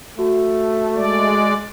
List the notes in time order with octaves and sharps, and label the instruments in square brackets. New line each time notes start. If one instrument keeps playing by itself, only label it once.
[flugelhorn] A3 [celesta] F#4
[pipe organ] G#3 D5